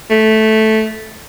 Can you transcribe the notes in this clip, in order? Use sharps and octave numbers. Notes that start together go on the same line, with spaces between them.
A3